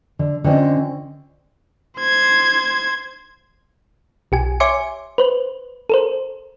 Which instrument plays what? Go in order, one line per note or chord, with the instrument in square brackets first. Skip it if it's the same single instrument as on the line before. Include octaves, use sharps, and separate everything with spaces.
[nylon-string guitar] D3
D3 C4 C#4 F4 C5 D#5
[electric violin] C5 G#6
[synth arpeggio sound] B1 G4 G#5
C#5 E5 G#5 C6 D6 C#7
B4 C5
A4 A#4 C5